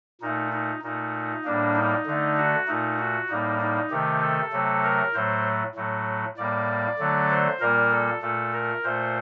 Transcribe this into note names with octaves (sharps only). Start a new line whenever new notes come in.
A#2 A3 D#4
D#4
A#2 A3 D#4
A2 G3 A#3 D4
D#4
D3 A3
F#4
A#2 A3 D#4
F#4
A2 G3 A#3 D#4
D#4
C3 D#3 A3 G4
A4
C3 F#3 A3
A#4
A2 F#3 A3 C5
A2 F#3 A3
A2 G3 A#3 D5
D3 F#3 A3
C5
A#2 G3 A#3 A#4
A4
A#2 A3 A4
A#4
A#2 A3 C5